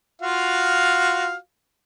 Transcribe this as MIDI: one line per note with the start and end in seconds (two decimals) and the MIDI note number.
0.22 1.35 65
0.22 1.35 66
0.22 1.35 77